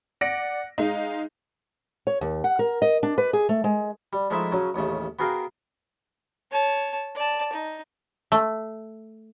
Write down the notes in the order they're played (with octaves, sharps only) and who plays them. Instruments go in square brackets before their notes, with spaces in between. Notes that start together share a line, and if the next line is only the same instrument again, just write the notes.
[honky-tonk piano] D5 A#6 D7 [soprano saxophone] F#5
[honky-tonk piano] G#3 D#4 [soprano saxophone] F5
[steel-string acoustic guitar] C#5
D#2
F#5
A#4
D#5
D4
B4
G#4
A3
G#3
[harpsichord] G3
F3 G#3 A3 D#4 E4 E5
C#3 F#3 C#4
A1 D#2 C#3 A3
B3 F#4 G#4 A#4 F5 G5
[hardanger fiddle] C#5 A5
D5 A5
D#4
[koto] A3